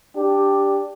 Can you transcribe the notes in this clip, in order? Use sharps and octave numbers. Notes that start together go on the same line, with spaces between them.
D4 G4